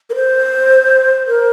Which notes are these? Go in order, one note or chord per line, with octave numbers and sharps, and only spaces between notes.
A#4
C5
A#4